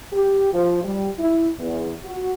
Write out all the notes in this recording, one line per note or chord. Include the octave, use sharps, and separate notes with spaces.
G4
F3
G3
E4
E2
F#4